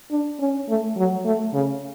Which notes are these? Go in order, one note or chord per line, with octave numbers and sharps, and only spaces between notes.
D4
C#4
A3
F#3
A3
C#3